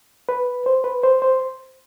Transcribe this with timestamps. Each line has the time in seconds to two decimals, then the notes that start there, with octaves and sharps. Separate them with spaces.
0.29 B4
0.66 C5
0.84 B4
1.03 C5
1.22 C5